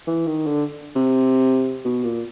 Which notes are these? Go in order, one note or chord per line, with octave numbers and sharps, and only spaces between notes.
E3
D#3
D3
C3
B2
A#2